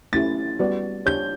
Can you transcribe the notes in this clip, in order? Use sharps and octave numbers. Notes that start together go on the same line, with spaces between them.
A3 C#4 E4 G4 A6
G3 B3 F#4 B4 D5
D4 G4 C#5 G6